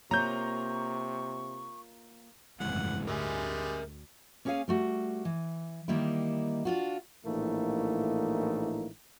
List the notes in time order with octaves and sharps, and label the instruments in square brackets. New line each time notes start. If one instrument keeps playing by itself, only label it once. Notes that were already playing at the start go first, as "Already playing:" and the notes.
[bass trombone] C3 [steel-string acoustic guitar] A#3 F4 C#5 [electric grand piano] A#5 G6 [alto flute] C#6
[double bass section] G1 F2 A2 [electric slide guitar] C#3 E3 G#3 [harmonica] F#5
[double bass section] D2 [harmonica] G3 G#3 [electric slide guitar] A#4 E5 G#5
[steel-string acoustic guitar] A#3 C#4 G#4 C#5 F5 G#5
G3 A3 F#4
E3
D#3 G3 A#3 D#4 E4
D4 F4 F#4
[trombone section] A#1 A2 E3 A3 A#3 D#4